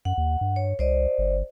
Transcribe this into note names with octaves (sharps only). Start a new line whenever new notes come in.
F#2 F#5
D#2
G2
C#5
C2 C5 D5 D#5
G1